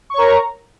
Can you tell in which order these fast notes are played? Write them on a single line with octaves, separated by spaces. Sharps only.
C#6 C#5 A#4 A#5